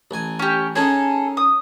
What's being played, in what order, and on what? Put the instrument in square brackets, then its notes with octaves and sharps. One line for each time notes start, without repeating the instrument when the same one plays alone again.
[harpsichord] A1 G#5
[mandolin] C#4 G4
[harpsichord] C#4 D#4 [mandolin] G#4 A4
[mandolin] D#6